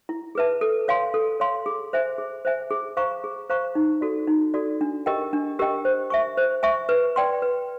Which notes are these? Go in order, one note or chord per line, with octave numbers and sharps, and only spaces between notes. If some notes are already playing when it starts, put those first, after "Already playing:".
E4
G#4 B4 E5 A5
A4
C#5 F5 G#5 C6
A4
C#5 F5 G#5 C6
G#4
C5 E5 G#5
G#4
C5 E5 G#5
G#4
C5 F5 A#5 C#6
G#4
C5 F5 A#5 C#6
D#4
F#4 A4 D5
D#4
F#4 A4 D5
D4
G4 A#4 D#5 G5
D4
G4 A#4 D#5 G5
C5
E5 G#5 C#6
C5
E5 G#5 C#6
B4
D5 G5 C6
B4